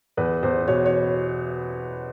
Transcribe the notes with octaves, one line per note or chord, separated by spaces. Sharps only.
E2 B4
E2 C5
B2 C#5
C#5